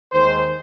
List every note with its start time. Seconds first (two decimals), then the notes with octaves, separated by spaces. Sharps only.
0.11 D#2 D#3 G#3 C5